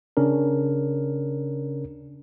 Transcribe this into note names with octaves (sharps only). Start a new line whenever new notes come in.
C#3 C#4 D4 A#4